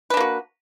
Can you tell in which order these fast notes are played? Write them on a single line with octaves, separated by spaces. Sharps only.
B4 D4 A#3 F#4